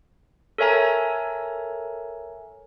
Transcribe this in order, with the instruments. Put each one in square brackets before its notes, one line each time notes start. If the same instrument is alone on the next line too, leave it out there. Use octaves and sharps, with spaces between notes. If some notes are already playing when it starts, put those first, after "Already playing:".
[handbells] A4 A#4 C#5 E5 G#5 A#5